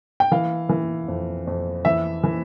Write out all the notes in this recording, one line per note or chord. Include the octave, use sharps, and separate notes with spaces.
G5
E3 F5
E3
F2
F2
E3 E5
E3